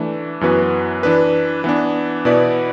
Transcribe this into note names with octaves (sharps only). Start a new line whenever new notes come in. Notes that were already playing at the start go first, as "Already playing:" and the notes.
Already playing: E3 A3 D4
F#2 E3 B3 F#4 B4
E3 D4 B4
E3 B3 D4
B2 B3 E4 B4 D5